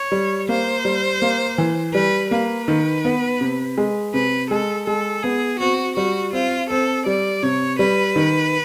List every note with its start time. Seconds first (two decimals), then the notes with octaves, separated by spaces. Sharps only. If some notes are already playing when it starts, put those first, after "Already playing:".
Already playing: C#5
0.12 G3
0.49 A#3 C5
0.85 G3
1.22 A#3
1.58 E3
1.94 G3 B4
2.31 A#3 B4
2.68 D#3
3.05 B3
3.41 C3
3.78 G#3
4.14 C3 B4
4.51 G#3 A4
4.87 G#3 A4
5.23 B3 G#4
5.60 C4 F#4
5.97 G3 F#4
6.33 C4 F4
6.70 C4 A4
7.06 G3 D5
7.43 C3 C#5
7.79 G3 B4
8.16 D#3